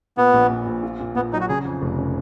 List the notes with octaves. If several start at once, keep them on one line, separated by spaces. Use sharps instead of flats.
A#2 B3
A#1
A#2
A#1
F4
A#2
A#2 B3
F#3 D#4
F#4
C#3 G#4
F2
F1
C#3